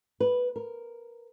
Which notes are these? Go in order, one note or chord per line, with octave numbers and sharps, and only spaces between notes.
B4
A#4